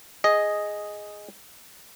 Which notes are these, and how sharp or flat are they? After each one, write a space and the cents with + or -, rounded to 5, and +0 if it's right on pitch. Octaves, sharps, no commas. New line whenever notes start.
G#4 +0 D#5 +0